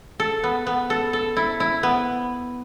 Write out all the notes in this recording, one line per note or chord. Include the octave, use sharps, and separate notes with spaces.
A4
B3
B3
A4
A4
E4
E4
B3